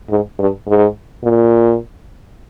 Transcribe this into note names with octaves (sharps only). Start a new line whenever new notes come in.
G#2
G2
G#2
A#2